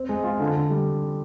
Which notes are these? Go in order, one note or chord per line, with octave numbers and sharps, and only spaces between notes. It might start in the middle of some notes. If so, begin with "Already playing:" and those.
Already playing: C4
G#3
F4
D3
D3
G3